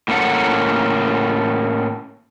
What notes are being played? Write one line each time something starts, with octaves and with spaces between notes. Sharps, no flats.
A2 A#3 C#4 A4 F#5